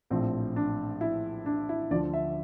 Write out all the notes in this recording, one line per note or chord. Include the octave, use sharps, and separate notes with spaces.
A#1 A2 F3 C4
D4
E4
D4
E4
D2 D3 F3 D5
E5